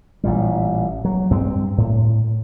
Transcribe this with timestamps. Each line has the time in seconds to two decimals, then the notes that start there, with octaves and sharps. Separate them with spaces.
0.24 A1 A#2 G3
1.05 F#3
1.31 G2 C4
1.78 A2